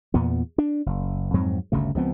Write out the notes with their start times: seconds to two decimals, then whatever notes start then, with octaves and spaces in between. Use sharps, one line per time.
0.14 E2 A#2 B3
0.58 D4
0.86 F#1
1.34 F2 G#2 F#3 C4
1.72 G1 D2 C#3 A3
1.95 C#2 F3 B3 C4